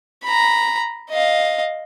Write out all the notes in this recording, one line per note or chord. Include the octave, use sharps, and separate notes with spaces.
A#5 B5
D#5 F5